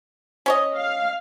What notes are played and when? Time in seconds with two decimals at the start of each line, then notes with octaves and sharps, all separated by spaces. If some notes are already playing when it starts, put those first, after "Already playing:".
0.46 C#4 C#5 D#5
0.77 F5